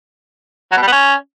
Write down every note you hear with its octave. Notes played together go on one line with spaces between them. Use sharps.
F#3
B2
G3
B3
C#4